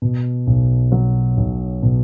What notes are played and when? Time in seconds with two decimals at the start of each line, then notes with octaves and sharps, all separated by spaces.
0.02 B2
0.47 B1
0.92 F#3
1.37 B1
1.82 B2